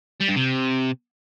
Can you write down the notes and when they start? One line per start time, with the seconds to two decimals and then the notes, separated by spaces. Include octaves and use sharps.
0.21 G3
0.29 G2
0.37 C3